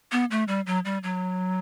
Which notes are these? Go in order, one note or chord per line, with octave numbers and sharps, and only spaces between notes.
B3
A3
G3
F#3
G3
F#3